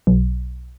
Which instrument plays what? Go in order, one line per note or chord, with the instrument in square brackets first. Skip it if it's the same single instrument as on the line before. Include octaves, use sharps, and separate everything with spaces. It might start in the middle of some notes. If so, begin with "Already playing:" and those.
[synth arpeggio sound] B1